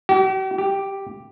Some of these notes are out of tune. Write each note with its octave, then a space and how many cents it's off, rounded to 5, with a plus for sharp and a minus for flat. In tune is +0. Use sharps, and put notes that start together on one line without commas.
G4 -45
G4 +0